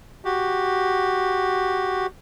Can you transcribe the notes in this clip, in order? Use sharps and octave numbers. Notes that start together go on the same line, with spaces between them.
F#4 G4